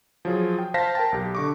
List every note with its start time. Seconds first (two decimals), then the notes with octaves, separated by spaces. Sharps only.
0.25 F3 F#3 F4 G#4
0.59 G5
0.74 C5 F5 A5 A#6 B6
0.95 A#4 G5 A5
1.12 B1 G4
1.35 D3 C#6 D6